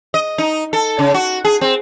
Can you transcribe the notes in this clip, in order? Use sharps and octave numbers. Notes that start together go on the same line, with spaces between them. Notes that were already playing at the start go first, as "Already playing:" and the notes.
D#5
D#4
A4
C#3
F#4
G#4
C4